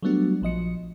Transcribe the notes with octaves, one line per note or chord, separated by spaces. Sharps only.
F#3 G3 A3 B3 D4 F#4
A#1 F3 D#5 C#7